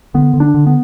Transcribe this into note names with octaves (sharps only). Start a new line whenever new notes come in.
D3 B3
D3
D4
D3
B3